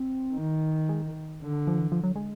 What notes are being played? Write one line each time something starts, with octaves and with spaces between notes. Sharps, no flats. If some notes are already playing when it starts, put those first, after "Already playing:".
Already playing: C4
D#3
G#3
D3
F3
E3
F3
F#3
G#3